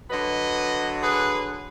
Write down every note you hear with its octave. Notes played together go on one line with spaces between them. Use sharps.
D3 F#3 B4 D#5
G#4 B4